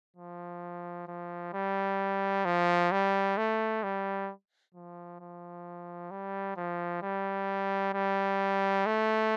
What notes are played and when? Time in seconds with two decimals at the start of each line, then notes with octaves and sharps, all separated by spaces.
0.17 F3
1.08 F3
1.54 G3
2.45 F3
2.92 G3
3.37 A3
3.83 G3
4.75 F3
5.20 F3
6.11 G3
6.57 F3
7.02 G3
7.94 G3
8.86 A3